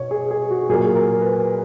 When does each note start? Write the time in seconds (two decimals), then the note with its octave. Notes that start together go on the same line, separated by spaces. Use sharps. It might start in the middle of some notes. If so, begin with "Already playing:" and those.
Already playing: B2 C#5
0.11 G#4
0.31 G#4
0.50 F#4
0.69 A#2 F#3 A#3 G#4
0.95 A#4
1.21 B4